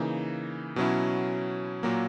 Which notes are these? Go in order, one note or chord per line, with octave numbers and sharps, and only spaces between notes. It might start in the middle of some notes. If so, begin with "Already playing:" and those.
Already playing: C#3 E3 A#3 D#4
B2 F#3 C#4 E4
A#2 F#3 A#3